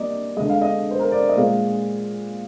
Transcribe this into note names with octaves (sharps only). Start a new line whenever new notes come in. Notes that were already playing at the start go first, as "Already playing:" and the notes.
Already playing: G3 A#3 D5 D#5
D3 G#3 D#5
F5
D#5
C5
A#4
D5
D#5
A#2 G#3 F5